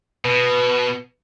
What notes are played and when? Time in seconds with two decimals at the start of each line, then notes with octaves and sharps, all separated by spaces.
0.25 B2 B4